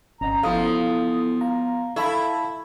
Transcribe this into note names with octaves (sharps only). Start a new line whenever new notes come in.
G1 C#4 D#5 F#5 A#5
F3 B3 E4 F#4 A4 F5 D#6
F5 A#5
E4 A4 E5 F5 A5 B5 C#6